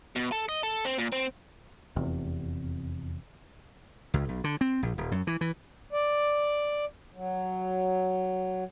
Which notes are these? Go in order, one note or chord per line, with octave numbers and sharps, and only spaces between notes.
B2
A4
D#5
A4
C4
A#2
C4
F1 E2 C3
C#2
B1
D3
C4
A#1
D#1
F#2
E3
E3
D5
F#3